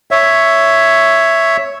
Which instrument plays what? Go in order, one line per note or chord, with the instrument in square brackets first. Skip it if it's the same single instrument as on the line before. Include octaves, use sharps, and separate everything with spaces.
[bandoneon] C#5 E5